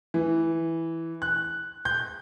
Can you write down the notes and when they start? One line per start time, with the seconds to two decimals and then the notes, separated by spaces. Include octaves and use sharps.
0.14 E3
1.22 F#6
1.85 G6